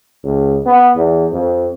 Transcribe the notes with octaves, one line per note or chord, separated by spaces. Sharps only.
C#2
B3
E2
F2